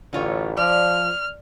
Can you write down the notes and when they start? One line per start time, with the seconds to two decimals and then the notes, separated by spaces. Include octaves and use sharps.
0.13 A1 D3 F4 C#5
0.57 F3 D5 F6